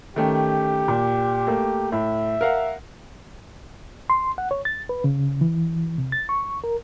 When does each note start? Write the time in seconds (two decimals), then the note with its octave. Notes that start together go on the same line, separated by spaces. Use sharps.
0.16 D#3 A3 C#4 G4
0.88 A#2
1.47 A3 A#3
1.92 A2 E5
2.41 A#4 F5 F#5
4.10 C6
4.38 F#5
4.51 C#5
4.65 A6
4.89 B4
5.04 C#3
5.41 E3
5.98 C3
6.12 A6
6.29 C#6
6.64 A#4